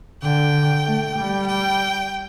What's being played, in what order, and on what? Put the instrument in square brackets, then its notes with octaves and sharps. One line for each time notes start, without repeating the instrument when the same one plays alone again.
[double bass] D3 [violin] G5
[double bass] A3
G3
[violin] G5